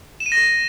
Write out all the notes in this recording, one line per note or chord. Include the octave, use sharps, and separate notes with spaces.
E7
D#7
A#6